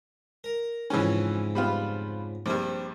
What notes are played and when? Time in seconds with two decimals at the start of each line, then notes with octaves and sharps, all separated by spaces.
0.44 A#4
0.90 F2 G#2 C#3 E3 C#4
1.55 G3 B3 F4
2.46 A#1 G2 C4